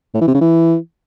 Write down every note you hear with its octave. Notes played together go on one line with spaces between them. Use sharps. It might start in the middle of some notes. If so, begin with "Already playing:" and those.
A2
E3
C3
C#3
E3